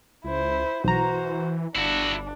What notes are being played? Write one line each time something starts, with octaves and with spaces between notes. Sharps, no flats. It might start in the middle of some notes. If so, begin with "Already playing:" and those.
C#2 E4 C5
B1 E3 F#4 C5 A#5
G1 D4 E4 F#4